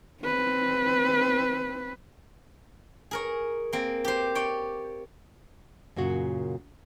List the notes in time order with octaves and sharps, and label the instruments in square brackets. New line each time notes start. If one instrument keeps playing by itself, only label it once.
[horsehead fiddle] C4 B4
[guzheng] G#4 A#4 C#5
A#3 C4
G4 C5
C#5 D5 G5
[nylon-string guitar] F#2 A#2 C#3 F#4